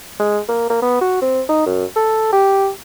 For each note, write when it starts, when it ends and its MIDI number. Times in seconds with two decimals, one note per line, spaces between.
0.20 0.39 56
0.48 0.69 58
0.70 0.80 58
0.82 1.01 59
1.01 1.17 66
1.22 1.41 60
1.49 1.65 63
1.66 1.85 42
1.96 2.28 69
2.33 2.69 67